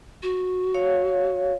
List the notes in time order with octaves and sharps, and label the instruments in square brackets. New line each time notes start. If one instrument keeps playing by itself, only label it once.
[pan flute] F#4
[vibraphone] C#5 F5